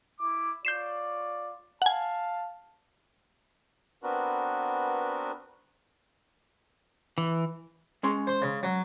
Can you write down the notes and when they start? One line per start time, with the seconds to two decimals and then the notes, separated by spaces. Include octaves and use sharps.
0.20 E4 D6
0.65 F4 C#5 D5 G6 C7 E7
1.82 F5 F#5 G#5 A5
4.03 B3 C4 D4 F#4 A#4 B4
7.18 E3
8.03 G#3 C#4 C6
8.27 C5
8.42 C#3
8.63 F#3